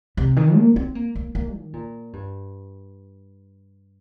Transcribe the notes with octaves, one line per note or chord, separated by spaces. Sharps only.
C3
D#3
A#3
C4
A#3
A#3
A#3
D#3
A#2
G2